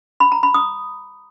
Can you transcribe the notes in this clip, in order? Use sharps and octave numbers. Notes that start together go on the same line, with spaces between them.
B5
A#5
B5
D#6